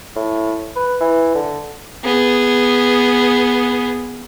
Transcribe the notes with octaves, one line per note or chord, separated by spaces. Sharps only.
A2
B4
E3
D3
B3 G#4